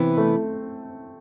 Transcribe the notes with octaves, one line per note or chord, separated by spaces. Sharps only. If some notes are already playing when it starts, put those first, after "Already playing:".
Already playing: C3 E3 B3 C4 E4 B4
A3